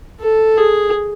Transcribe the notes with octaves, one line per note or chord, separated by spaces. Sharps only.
A4
G#4